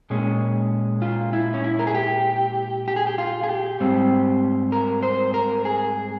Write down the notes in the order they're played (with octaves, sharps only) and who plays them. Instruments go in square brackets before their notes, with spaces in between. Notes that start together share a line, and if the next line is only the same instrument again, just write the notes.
[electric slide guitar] A#2 G#3 C#4
F4
E4
C#4
E4
A#4
G#4
G4
G4
G#4
G4
F4
G#4
G4
G#2 G3 C4
A#4
C5
A#4
G#4